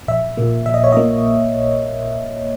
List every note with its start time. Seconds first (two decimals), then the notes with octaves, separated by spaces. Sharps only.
0.08 A#1 E5
0.37 A#2 A#3
0.66 A#1 E5
0.74 D#5
0.84 C#5
0.92 A#2 A#3 D#5